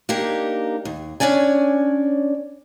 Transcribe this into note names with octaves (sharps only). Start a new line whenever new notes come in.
A#3 D4 D#4 G4 A#4
D#2
C#4 D4 C#5 D5 G#5